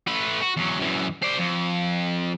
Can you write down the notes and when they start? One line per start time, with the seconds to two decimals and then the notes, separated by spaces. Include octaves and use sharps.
0.07 A3 B4
0.42 F#4
0.57 E2 F#3
0.80 F#2 E3
1.22 C5 D5
1.38 F2